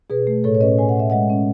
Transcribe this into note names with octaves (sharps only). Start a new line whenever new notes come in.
B2 G#4 B4
A3
A2 A4 C#5
C#5
C#4 B4 D#5
A2 G#5
F#5
A2 E5
G#3 D#5 F#5
C#4